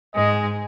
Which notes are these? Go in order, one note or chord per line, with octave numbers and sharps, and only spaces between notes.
G#2 G#3 D#5